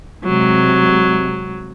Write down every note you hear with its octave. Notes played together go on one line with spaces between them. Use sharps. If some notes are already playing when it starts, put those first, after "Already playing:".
C3 F#3 G#3